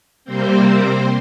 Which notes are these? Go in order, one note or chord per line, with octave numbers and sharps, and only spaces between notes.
C3 G3 A#3 C4 C5